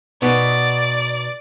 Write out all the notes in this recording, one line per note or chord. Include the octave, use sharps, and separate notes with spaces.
B2 B3 D#4 D5